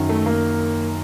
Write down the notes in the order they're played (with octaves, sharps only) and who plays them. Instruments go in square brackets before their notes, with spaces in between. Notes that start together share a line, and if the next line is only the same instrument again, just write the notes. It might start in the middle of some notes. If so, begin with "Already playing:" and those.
Already playing: [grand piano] F#2 D#3 F#3
A3
A#3